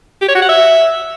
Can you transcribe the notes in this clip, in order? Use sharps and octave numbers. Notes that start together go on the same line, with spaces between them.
G4
C#5
F#4
F#5
E5